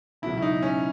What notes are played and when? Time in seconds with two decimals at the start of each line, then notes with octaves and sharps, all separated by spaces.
0.22 C#2 B2 F#3 E4
0.37 E4
0.42 D#4
0.63 C#4